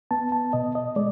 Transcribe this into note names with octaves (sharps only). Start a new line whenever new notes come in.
B3 A5
A5
B2 D#5
D#5
G#3 D5